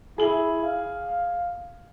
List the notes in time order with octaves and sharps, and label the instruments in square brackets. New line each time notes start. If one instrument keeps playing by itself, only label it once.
[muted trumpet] E4 [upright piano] G#4 F#7
[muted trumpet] F5